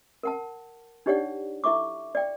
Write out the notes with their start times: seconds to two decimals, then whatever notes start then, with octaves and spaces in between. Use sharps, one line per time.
0.23 A#4 F#5 A5
1.06 D4 D#4 G4 C#5 D5 F#5
1.64 E4 A4 E5 C#6 D6
2.15 D5 G5